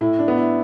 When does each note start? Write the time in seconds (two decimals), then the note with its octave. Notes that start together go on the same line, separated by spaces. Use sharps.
0.01 A2 E4
0.19 D4
0.28 B3
0.38 E4